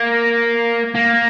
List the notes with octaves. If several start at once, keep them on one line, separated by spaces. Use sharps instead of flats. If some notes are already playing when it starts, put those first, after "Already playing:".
Already playing: A#3
A#3